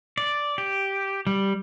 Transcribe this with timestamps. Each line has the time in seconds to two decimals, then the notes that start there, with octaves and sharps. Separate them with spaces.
0.18 D5
0.58 G4
1.27 G3